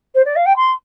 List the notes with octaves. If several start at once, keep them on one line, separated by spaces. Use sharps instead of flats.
C5
D5
F5
G5
C6